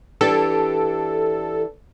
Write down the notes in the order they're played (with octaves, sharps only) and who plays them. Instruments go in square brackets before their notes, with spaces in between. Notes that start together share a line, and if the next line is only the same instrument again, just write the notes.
[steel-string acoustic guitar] E3 D4 G4 [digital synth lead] A4